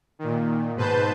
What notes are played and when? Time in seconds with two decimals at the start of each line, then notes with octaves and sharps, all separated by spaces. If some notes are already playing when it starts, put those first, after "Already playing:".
0.19 A#2 D#3
0.76 G#2 B2 B4 C5 A5 G6